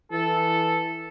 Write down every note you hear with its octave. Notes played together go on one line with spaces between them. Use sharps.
E3 A4